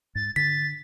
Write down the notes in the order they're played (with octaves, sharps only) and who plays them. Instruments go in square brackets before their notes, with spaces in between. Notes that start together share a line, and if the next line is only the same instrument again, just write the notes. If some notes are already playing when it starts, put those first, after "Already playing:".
[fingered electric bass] G#2 [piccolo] A6
[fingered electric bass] D3 [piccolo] A6 [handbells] B6